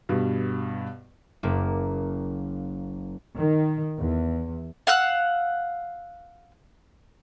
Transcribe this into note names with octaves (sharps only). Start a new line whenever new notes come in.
G2 B2
F#1 A#3 D6
D#3
E2
F5 F#5 E6 F#6